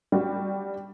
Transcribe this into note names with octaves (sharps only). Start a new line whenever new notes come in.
G3 F#4